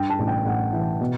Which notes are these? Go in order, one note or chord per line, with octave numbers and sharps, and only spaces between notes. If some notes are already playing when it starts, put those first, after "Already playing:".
Already playing: G2 G5
A5
A1
G5
A1 F#5
E3
B2